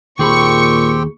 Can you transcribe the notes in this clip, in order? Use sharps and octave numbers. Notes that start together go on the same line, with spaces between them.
D#2 A#2 C4 G4 G#4 G5 B5 C#6